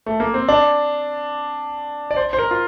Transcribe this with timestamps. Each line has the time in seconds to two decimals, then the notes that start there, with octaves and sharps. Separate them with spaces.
0.06 A3
0.20 A#3
0.34 C4
0.48 D4
2.11 D5
2.17 C5
2.33 C5
2.39 A#4
2.51 F4